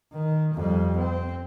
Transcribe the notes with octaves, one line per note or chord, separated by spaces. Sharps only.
D#3
F2 G3
C4